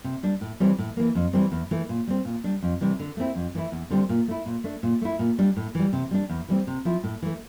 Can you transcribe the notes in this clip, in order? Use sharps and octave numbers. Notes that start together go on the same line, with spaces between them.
C3
G3 D4
A2
E3 G3 C4
A2
E3 A#3
F2
E3 G3 C4
E2
E3 A3
A#2
G3 C4
A#2
G3 D4
F2
C3 E3 G3
D3
A3 C4 E4
F2
E3 A3 E4
E2
D3 G3 C4
A#2
A3 E4
A#2
A3 D4
A#2
A3 E4
A#2
G3 D4
A2
E3 G3
C3
G3 D4
E2
E3 G3 C4
C3
F3 C4 E4
A2
E3 A3